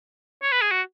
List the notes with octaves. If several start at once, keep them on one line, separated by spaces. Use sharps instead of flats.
C#5
B4
G#4
F#4